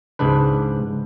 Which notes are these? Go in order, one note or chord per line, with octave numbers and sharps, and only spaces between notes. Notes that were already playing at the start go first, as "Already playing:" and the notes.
C#2 G#2 D4 B4